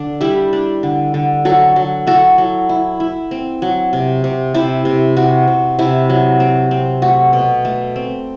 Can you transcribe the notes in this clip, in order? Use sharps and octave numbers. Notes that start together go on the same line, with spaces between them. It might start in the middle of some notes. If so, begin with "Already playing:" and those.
Already playing: D3 D4
G3 E4 G4
D4
D3
D3
F#3 F#4 A4
F#3
E4 F#4 A4
F#3
E4
E4
C4
F#3
C3
C3
C3 E4 G4
C3
C3 F#4
C3
C3 E4
F#3
C4
C4
A3 F#4
B2
A3
C4